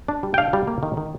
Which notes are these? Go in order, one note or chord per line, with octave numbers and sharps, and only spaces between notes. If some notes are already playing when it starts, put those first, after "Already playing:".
D4
G3
G5
D4 F5
G3
A#3
D#3
D#3